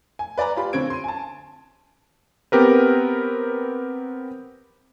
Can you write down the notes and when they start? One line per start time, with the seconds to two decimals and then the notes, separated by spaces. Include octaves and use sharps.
0.19 G#5
0.38 B4 D5 G#5 A#5
0.56 F4 G4 B5
0.73 D3 C4 C#4 C5 G#6 D7
0.90 C6 D#7
1.04 G#5 A5
2.52 B3 C4 G4 A#4 B4